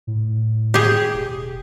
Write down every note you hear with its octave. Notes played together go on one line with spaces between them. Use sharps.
A2
G4 G#4
E1